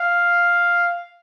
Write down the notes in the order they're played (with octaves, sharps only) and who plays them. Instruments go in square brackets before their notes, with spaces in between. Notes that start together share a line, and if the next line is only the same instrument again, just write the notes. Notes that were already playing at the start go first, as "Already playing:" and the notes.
Already playing: [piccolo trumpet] F5